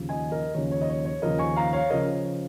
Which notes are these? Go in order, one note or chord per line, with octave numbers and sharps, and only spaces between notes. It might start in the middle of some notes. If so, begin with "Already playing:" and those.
Already playing: D#2 C#3 F3
D#5 G#5
A#4 D#5
D#2 C#3 F3 C#5
C#5
D#5
C#5
C#5
D#2 C#3 F3 A#4 D#5
G#5 C#6
F5 A#5
C#5 F5
C#3 F3 A#4 D#5